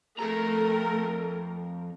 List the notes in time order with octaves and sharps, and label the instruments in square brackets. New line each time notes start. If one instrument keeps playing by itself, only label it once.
[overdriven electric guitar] F2 A#5 [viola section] A3 A4 A#4